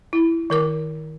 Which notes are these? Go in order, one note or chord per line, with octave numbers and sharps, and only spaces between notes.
E4
D#3 A#4 D6